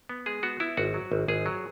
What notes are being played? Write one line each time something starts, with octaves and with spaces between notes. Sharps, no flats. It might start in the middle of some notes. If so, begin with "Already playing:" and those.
B3
G#3 G#4
B3 F#4
B3 E4
G#1 F#4
F#3
G#1
G#1 G#4
F#3